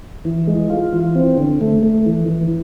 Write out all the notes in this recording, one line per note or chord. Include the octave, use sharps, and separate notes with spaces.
E3
G#3
F4
E3
C4
D3
A3
A3
E3
E3